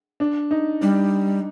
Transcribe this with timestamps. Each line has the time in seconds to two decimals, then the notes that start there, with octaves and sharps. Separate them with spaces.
0.20 D4
0.51 D#4
0.81 G3 D4